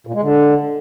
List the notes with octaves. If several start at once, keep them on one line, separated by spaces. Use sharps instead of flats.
A#2
G#3
D3